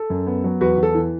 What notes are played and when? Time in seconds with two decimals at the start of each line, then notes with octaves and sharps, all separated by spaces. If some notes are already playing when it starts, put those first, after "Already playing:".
Already playing: A4
0.10 F#2
0.27 B3
0.44 F#3
0.61 E2 F#4 B4
0.78 E2
0.83 A4
0.95 E3